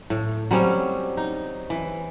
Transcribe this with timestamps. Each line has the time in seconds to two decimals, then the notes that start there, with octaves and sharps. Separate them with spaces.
0.10 A2
0.51 F#3 G3 C4 C#4
1.17 D#4
1.70 E3